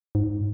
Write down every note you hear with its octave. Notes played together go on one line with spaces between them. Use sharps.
G#2